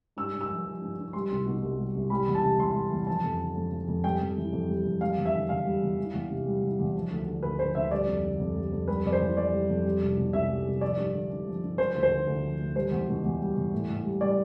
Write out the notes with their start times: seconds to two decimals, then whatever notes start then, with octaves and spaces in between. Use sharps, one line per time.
0.17 G2 E6
0.33 G2
0.41 E6
0.50 F3
0.65 F3
0.81 G2
0.98 G2
1.13 G3 C6
1.30 C2
1.46 B2
1.62 C2
1.78 G3
1.95 C2
2.10 G3 B5
2.27 E2
2.35 A5
2.43 C3
2.59 E2 C6
2.75 G3
2.91 E2
3.07 F3 A5
3.24 F2
3.40 D3
3.56 F2
3.72 F3
3.88 F2
4.04 G3 G5
4.21 F2
4.37 E3
4.52 F2
4.68 G3
4.85 F2
5.01 G3 F5
5.18 E2
5.25 E5
5.34 D3
5.49 E2 F5
5.65 G3
5.82 E2
5.97 E3
6.14 E2
6.30 C3
6.46 G3
6.62 E3
6.79 E2
6.95 F3
7.11 D2
7.26 D3
7.43 D2 B4
7.59 F3 C5
7.75 D2 E5
7.91 G3 D5
8.07 F2
8.24 D3
8.40 F2
8.56 G3
8.72 F2
8.88 G3 B4
9.05 F2 D5
9.12 C5
9.20 E3
9.36 F2 D5
9.53 G3
9.69 F2
9.84 G3
10.01 C2
10.17 B2
10.33 C2 E5
10.49 G3
10.66 C2
10.81 F3 D5
10.97 G2
11.14 D3
11.30 G2
11.47 F3
11.62 G2
11.78 F3 C5
11.95 D2
12.03 C5
12.11 D3
12.27 D2
12.43 F3
12.59 D2
12.76 G3 C5
12.91 E2
13.08 B2
13.24 E2
13.40 G3
13.56 E2
13.72 A2
13.89 A2
14.04 G3
14.21 G3 D5